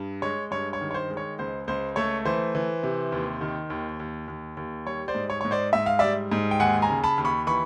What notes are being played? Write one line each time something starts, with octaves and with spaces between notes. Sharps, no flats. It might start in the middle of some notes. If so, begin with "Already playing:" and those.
Already playing: G2
G#3 C#5
G2 C#5
C#5
D#3
C#5
C5
G#3
C#5
C#2 C5
C#2 C5
A3 C#5
E3 C5
E3
C3
D#2
D#3
D#2
D#2
D#2
D#2
G3 C#5
C5 D5
G#2
C#5
G#2 C#5
C5 D5
G#2 E5
F5
G3 D5 E5
G#2
G5
D#2 F#5 G#5
G#5 A#5
C#3
A5 B5
D#2
B5 C#6
E3 B5 C#6